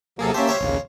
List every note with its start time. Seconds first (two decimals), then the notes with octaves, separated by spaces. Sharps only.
0.19 D#2 C3 F#3 A#3 G#4 A4
0.34 A#3 C#4 G4 C5 E5 A5
0.48 C5 C#5 F5
0.60 A#1 D#2 C#3